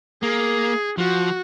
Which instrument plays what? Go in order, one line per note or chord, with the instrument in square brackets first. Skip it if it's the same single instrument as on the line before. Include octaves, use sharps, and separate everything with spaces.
[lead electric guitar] A#3 [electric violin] G#4
[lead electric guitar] F3 [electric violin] F#4